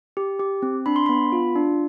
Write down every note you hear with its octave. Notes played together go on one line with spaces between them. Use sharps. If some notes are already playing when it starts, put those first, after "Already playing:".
G4
G4
C4
D4 B5
C6
B3 B5
F4
D4